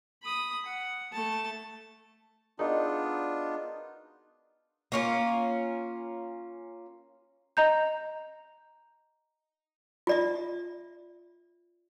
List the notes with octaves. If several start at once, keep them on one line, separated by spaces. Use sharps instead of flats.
B5 D#6
F#5
A3 A5
B3 D4 D#4 F4 F#4 G#4 A#4 D5
A#3 C#4 F4
D#5 A#5 G6
F4 D5 E5